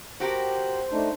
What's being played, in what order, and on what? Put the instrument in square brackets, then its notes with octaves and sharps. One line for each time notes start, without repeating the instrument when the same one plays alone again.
[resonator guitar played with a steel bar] F#4 G4 A#4 [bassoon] C5
[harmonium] A3 D4 D#4